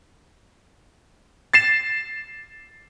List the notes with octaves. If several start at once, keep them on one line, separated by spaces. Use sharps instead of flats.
A6 C7 E7